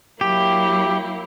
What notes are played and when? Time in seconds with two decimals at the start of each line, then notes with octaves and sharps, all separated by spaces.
0.21 F#3 A#3 E4 G4